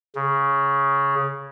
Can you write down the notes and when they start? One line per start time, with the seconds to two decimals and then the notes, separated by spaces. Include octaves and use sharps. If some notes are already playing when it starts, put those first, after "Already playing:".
0.16 C#3